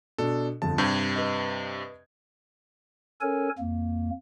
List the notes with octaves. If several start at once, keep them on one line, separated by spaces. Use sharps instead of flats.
B2 D4 A4
G1 F2 A5
G2 C3 G6 G#6
B4 D#5
C#4 A4 A#4 C#5 G#5
F2 A#3